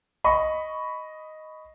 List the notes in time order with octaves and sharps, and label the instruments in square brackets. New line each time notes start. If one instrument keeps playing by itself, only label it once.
[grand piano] D#5 B5 C#6